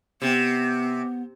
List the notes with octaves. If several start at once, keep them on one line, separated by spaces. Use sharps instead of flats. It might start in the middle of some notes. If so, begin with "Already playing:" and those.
C3 B3